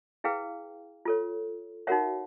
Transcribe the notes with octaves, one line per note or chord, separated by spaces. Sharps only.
E4 G#4 B4 F5 G5
F4 A4 C#5
D#4 F#4 A#4 C#5 E5 F#5